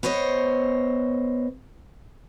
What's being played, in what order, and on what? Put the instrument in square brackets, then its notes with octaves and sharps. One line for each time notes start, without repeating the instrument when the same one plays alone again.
[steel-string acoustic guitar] B3 C5 C#5 D#5